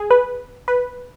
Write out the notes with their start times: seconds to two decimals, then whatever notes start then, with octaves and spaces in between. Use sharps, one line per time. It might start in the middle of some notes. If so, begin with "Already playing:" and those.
Already playing: G#4
0.10 B4
0.68 B4